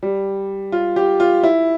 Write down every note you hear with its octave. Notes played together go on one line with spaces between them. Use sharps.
G3
F4
G4
F4
E4